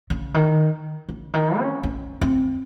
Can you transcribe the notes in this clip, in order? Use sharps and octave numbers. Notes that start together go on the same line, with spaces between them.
C#3
D#3
C#3
D#3
C#4
C#4
C4